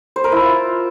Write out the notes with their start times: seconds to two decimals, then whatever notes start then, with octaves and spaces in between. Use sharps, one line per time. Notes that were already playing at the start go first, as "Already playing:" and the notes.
0.16 C5
0.24 A#4
0.32 E4
0.40 F4